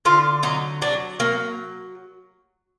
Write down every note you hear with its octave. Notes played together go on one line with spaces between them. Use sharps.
D3 F4
F#3 D#4
F#3 D4
F#3 A#3